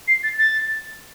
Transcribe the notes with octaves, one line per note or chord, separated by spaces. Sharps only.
C7
A6
A6